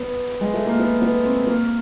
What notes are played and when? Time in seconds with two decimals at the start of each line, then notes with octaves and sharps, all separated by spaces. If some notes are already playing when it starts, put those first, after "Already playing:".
Already playing: B3
0.41 G#3
0.54 A3
0.66 A#3
0.80 B3
1.02 B3
1.25 C4
1.47 A#3